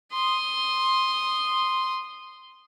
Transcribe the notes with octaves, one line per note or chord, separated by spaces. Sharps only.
C6 D#6